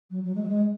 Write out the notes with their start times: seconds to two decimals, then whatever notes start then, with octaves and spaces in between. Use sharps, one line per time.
0.11 F#3
0.24 F#3
0.35 G#3
0.43 F#3
0.48 G#3